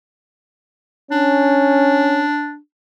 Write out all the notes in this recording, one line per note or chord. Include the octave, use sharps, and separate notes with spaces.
C#4 D4